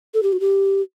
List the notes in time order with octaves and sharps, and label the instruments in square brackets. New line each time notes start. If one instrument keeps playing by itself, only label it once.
[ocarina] A4
G4
F#4
G4